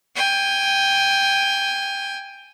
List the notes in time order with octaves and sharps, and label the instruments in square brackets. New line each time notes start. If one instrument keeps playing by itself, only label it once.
[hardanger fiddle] G5 G#5